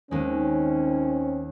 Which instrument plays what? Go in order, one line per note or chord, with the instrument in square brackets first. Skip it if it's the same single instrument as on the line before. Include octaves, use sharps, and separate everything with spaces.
[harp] D#2 G#3 [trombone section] D#3 C4 C#4